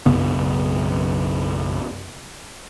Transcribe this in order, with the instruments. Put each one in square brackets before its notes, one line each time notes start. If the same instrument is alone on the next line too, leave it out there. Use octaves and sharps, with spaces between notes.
[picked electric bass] B1 F#2 C#3 B3